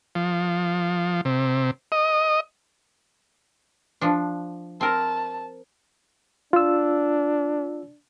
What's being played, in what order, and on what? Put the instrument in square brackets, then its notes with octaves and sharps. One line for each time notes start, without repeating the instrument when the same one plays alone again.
[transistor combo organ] F3
C3
D#5
[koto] F3 D4
[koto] C4 A#4 [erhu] A5
[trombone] D4 [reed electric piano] F4 E6